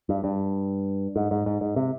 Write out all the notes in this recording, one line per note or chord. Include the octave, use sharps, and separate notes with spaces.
G2
G2
G#2
G#2
G#2
G#2
C3